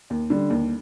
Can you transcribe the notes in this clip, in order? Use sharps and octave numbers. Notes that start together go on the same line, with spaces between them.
D#2
D3 G3
D#2